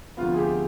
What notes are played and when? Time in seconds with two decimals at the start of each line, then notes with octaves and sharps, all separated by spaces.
0.17 D2 C3 F3 B3 F4
0.34 G#4
0.38 G4